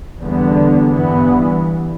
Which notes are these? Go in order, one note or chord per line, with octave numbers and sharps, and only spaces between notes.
E2 D3 G3 B3
G2 E3 B3